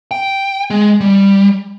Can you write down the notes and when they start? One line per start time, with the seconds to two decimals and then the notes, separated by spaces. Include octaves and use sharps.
0.11 G5
0.70 G#3
1.01 G3